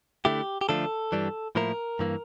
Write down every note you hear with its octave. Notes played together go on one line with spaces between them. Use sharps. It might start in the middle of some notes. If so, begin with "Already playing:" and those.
D3 A3 E4 G4
G4
D3 F3 A3 D4 F4 A4
G2 E3 G3 D4
A2 F3 A#3 E4 A#4
G2 E3 A#3